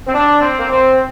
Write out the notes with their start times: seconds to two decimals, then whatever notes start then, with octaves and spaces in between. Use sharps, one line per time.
0.07 C4
0.13 D4
0.41 C4
0.58 A#3
0.69 C4